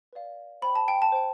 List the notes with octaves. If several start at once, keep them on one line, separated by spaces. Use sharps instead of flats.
B4 D5 F5
C5 G5 B5
A5
G5
A5
C5 G5